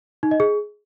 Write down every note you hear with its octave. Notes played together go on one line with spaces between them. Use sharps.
D#4
D#5
G#4